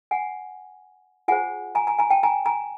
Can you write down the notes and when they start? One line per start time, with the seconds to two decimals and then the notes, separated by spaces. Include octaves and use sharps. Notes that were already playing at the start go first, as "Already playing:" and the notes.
0.11 F#5 G#5
1.28 F4 G#4 C5 F#5 G#5
1.75 G#5 A#5
1.87 G#5 A#5
1.99 G#5 A#5
2.10 G5 A5
2.23 G#5 A#5
2.46 G#5 A#5